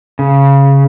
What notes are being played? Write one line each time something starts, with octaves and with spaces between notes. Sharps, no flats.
C#3